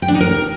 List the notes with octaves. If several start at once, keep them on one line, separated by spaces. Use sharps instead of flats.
G5
D4
D#4
A#4